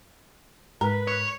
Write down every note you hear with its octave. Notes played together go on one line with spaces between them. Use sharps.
G#2 A#4 B4
C#5